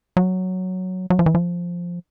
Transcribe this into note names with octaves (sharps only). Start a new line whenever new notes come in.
F#3
F#3
F3
E3
F3